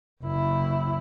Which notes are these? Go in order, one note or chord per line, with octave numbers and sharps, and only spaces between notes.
F#1 E4